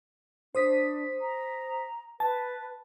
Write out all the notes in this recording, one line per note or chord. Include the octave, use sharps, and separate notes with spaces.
D4 C5 D#6 B6
A#5
B4 A5